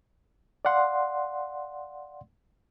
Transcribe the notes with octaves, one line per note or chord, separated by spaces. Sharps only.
D5 F5 F#5 C6